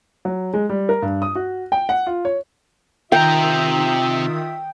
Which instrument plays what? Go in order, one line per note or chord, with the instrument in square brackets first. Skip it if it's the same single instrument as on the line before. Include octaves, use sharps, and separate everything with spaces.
[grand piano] F#3
G#3
G3
A#4
G2
D#6
F#4
G5
F#5
F4
C#5
[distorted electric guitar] C3 A#5 [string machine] D#3 D#6 [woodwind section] F4 E5 [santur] G5